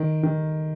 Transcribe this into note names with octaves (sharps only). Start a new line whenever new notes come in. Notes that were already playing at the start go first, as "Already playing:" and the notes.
Already playing: D#3
D#3